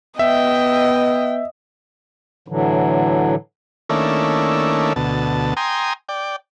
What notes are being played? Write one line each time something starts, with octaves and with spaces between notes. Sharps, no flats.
B3 D#5 E5 G5
A2 D3 E3 F#3
D#3 A3 A#3 C#4 D4 E4
D2 B2 A5
G5 G#5 A#5 C6 D#6
D5 G5